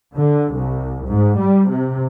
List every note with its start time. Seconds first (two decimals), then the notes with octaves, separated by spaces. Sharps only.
0.16 D3
0.54 C2
1.07 G#2
1.39 G3
1.70 C3